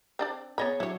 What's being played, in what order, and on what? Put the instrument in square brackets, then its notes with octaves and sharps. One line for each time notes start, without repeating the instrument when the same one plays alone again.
[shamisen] C4 D4 D5
[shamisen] B3 D#5 B5 [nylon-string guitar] G#4 C#5
[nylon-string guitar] F#3 D4 [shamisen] E4 C#5